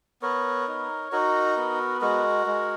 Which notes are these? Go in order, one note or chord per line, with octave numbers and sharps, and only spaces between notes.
B3 A#4 C#5
D#4
D#4 F#4 A#4
B3
G#3 F#4 A#4
G#3